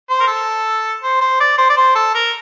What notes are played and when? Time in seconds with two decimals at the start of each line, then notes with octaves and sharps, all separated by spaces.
0.10 C5
0.20 A#4
0.27 A4
1.03 C5
1.21 C5
1.40 D5
1.58 C5
1.69 D5
1.77 C5
1.95 A4
2.15 A#4